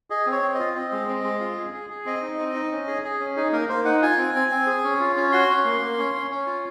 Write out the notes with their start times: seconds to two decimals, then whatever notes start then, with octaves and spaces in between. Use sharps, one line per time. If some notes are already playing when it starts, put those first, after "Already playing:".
0.10 G#4 D#5
0.27 C4
0.32 C#5
0.42 C4
0.54 D#5
0.60 F4
0.75 C4 D#5
0.92 G#3
1.08 C4
1.24 G#3
1.41 F4
1.58 G#4
1.73 G#4
1.90 G#4
2.06 C4 D#5
2.22 D#4
2.39 C4
2.55 D#4
2.71 C#4
2.87 G#4
3.04 G#4
3.20 C#4
3.36 D#4 G#4
3.52 A#3 A#4
3.69 A#3 C5
3.85 D#4 F#5
4.02 F4 G#5
4.18 C4
4.35 C4
4.51 C4
4.67 G#4
4.84 C#4
5.00 F4
5.16 C#4
5.32 F#4 C6
5.49 C#4
5.65 A#3
5.81 A#3
5.98 C#4
6.14 C#4
6.31 C#4
6.47 F4